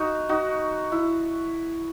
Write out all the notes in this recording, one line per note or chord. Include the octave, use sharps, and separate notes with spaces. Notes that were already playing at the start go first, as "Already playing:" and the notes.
Already playing: D#4 F#4
D#4 F#4
E4